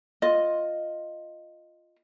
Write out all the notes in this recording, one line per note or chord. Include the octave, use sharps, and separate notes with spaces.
F4 D#5